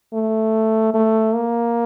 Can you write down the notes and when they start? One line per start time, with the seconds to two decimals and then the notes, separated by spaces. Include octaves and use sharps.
0.13 A3
0.94 A3
1.34 A#3